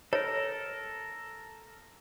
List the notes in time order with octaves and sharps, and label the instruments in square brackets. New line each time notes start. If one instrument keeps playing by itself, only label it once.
[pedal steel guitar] A4 A#4 [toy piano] C#5